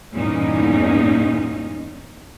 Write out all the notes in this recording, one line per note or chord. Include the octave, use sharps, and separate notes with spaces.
E2 G2 A#2 C#4 D#4